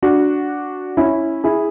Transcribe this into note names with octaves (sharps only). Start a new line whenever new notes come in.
D4 F#4
C#4 E4
E4 G#4